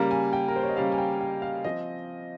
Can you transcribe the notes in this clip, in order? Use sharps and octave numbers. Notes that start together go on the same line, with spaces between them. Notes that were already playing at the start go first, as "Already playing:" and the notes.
Already playing: C#3 G3 A#3 A#4
G#5
G5
A#4
C5
C#5
D#5
C#3 G3 A#3 F5
G#5
G5
G5
F5
F3 C4 D#5